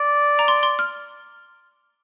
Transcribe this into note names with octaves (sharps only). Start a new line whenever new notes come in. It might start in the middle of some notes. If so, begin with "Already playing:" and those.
Already playing: D5
A#5
C6
C6
F6